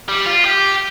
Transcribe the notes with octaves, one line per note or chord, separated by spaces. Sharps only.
G3
F4
G4